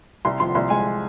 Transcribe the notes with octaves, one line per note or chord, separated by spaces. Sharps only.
C2 C6
F3 C6
C2 C6
G#3 G#5